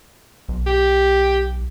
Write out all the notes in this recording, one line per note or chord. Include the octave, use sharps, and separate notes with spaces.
B1
G4